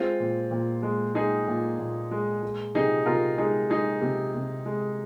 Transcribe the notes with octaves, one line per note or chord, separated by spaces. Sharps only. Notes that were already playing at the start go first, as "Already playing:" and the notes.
Already playing: G#3 C4 F4
A#2
A#2
G#3
G#3 D#4 G#4
A#2
A#2
G#3
G#3
C3 D#4 G#4
C3 F4 A#4
G#3 D#4 G#4
G#3 D#4 G#4
C3
C3
G#3